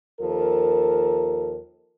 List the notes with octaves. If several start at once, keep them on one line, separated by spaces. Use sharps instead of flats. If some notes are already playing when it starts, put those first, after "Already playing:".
D#2 F3 A4 A#4